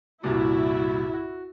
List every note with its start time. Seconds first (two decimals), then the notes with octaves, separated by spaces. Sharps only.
0.23 C2 G2 A#2 E4 F#4
1.14 F#4